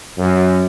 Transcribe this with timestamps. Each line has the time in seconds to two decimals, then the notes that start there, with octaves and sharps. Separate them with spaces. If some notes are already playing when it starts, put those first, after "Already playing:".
0.18 F#2